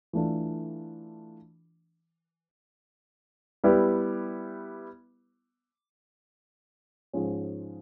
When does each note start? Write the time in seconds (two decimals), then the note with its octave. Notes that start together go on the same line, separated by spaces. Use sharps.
0.13 E3 A3 D4 F4 A4
3.64 G3 B3 E4 G4 B4
7.13 G#2 F3 G#3 C#4